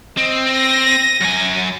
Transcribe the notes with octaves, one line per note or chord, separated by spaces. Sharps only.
C4 D#5
A#6 D#7
F#2 G#5